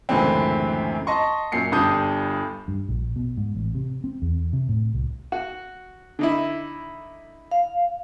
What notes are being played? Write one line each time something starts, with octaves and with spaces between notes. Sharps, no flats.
C#2 F#2 A2 D3 E3 C4
D#5 A5 C6 C#6
F#2 A#2 C7 C#7
G1 G2 D4 A5 D#6 G6
G2
A#1
B2
G#2
A1
C3
C4
E2
C3
A2
C2
F#4
D3 D#4 E4
F5